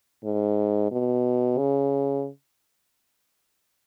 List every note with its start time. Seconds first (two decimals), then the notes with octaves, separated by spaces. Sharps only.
0.24 G#2
0.92 B2
1.58 C#3